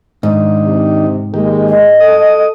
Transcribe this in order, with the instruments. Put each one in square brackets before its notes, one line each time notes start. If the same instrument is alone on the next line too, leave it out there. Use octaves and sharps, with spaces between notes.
[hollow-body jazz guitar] G#2 [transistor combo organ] D#3 D4 D#4
[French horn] C3
[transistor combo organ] D#3 A#3 G4 [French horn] G#3
[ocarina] D#5
[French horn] A4 [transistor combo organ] D#6